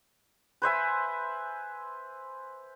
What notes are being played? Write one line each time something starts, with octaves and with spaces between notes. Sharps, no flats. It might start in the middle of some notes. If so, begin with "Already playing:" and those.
B4 C5 E5 G#5